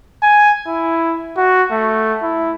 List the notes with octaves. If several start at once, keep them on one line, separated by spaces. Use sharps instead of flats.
G#5
E4
F#4
A3
E4